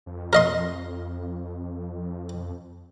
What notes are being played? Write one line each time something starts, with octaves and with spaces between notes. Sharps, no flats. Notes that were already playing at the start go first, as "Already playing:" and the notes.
F2
A#4 D#5 C6